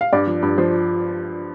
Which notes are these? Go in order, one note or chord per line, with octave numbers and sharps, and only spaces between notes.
F5
G2 D5
F3
G2
F3 C5